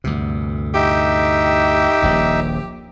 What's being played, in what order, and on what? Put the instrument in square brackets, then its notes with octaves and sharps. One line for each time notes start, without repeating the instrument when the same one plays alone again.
[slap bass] D2 G2 C3
[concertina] D#4 E5 [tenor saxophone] G4
[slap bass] D#1 A#1 D#2